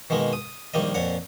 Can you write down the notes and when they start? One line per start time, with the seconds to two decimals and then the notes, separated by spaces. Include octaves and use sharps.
0.10 B2 D#3 G#3 A#3
0.33 D#6
0.74 A#1 D#3 G3 A#3 D#5
0.94 F2 A#2 C#5 F#5